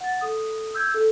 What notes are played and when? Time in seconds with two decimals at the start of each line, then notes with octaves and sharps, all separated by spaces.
0.01 F#5 A6
0.21 A4 D#6
0.74 E6 G6 G#6
0.94 A4